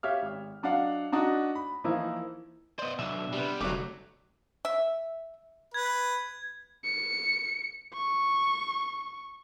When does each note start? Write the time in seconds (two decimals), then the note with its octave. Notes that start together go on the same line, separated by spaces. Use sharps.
0.03 G4 C#5 E5 F5 F6
0.22 G#1
0.63 F#3 D4 D#5 F5 F#5
1.12 D4 D#4 F#4 D#5
1.55 B5
1.84 E3 F3 A#3 D#4 E4
2.79 B3 C5 D5 D#5
2.99 B1 B2 D4 E5
3.33 C3 G3 B3
3.61 F1 D2 C3 F#3 A3 D#4 D6
4.65 E5
5.74 B4 G#6
6.84 C#7
7.94 C#6